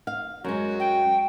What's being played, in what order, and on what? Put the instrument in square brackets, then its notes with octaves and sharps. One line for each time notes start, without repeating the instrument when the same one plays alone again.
[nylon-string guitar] F5
[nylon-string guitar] F#2 G#3 [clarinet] F#4
[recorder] G5